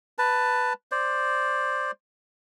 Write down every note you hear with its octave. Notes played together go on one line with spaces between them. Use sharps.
B4 A5
C5 D5